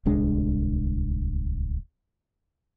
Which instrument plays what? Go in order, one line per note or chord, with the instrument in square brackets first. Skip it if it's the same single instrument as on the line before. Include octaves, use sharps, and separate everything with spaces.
[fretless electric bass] D1 C2 G#3 D4